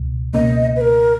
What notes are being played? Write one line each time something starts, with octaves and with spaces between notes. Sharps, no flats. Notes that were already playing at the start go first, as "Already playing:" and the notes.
Already playing: C#2 B2
C#2 B2 A#3 C#4 D#5
B4
A#4